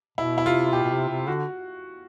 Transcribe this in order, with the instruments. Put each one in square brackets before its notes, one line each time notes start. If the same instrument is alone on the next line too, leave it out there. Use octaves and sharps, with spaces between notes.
[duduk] B2 [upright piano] E4
[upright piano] E4
[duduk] C3 [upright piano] F4
[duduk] B2 [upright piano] G4
[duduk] B2
C3
C3
[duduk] D3 [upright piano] F#4